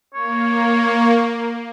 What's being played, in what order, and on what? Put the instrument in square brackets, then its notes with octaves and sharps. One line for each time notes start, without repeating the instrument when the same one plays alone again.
[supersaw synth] A#3 [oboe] C#5